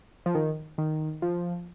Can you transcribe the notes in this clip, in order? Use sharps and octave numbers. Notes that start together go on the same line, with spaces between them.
F3
D#3
D#3
F3